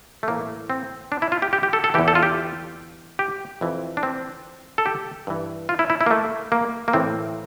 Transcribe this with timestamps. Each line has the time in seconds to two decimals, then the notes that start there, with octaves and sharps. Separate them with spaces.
0.23 A3
0.28 A2 E3 A#3
0.70 C4
1.12 D4
1.22 E4
1.32 F4
1.42 G4
1.53 G4
1.63 G4
1.73 A4
1.84 A4
1.94 E3 G4
1.98 E2
2.08 A4
2.15 F4
2.23 G4
3.19 G4
3.61 F2 E3
3.97 D4
4.03 C4
4.78 A4
4.86 G4
5.27 G2 E3
5.69 F4
5.79 E4
5.90 E4
6.01 E4
6.06 A#3
6.11 A3
6.52 A#3
6.88 A#3
6.93 A2 E3 C4